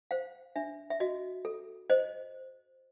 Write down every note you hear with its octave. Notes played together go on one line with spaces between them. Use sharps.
C5 F5
D4 E5
E5
F#4 D#5
A4
C5 D#5